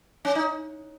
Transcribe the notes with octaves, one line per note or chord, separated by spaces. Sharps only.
C#4
D#4